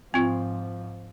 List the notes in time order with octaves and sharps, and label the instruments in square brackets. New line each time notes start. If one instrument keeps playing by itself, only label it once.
[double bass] G#2 F3 [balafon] C4 F4